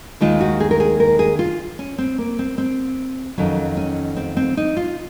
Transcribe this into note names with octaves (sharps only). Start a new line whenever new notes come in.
D#2 D#3 G#3 F4
F#4
G#4
A#4
G#4
A#4
G#4
F4
C#4
C4
A#3
C4
C4
F2 D#3 F#3 C#4
C#4
C4
C4
D#4
F4